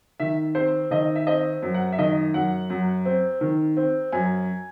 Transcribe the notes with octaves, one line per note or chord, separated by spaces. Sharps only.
D#3 E5
C4 C5
D#3 D#5
E5
C4 D#5
F#2
F#5
E5
D#3 D#5
F#2 F#5
F#2
C4
D#3
C4
F#2 G#5